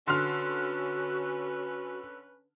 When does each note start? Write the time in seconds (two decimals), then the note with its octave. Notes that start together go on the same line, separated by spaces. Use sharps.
0.08 D3 C#4 F#4 B4 C6 F6